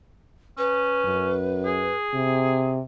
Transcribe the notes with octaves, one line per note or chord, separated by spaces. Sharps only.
C#4 B4
F#2
G#4
C3